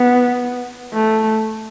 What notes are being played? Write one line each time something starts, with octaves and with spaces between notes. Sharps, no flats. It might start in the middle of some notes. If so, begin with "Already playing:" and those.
Already playing: B3
A3